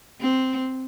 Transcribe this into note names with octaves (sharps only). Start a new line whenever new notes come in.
C4